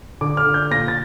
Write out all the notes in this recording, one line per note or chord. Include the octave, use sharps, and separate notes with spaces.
D3 D6
F6
D3
G6
A#2 A#6
A6